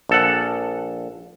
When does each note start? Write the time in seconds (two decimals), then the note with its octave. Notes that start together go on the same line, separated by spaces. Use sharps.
0.09 A#1 A4 F#5